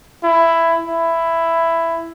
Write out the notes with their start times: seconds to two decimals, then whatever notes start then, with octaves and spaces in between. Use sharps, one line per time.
0.23 E4
0.88 E4